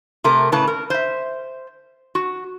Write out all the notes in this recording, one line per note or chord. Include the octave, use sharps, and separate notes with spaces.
C3 A3 A#4
A2 C#3 B4 A5
A#4
C5 E5
F#4